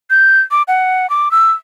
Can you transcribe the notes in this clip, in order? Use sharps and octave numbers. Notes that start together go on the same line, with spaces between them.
G6
D6
F#5
D6
E6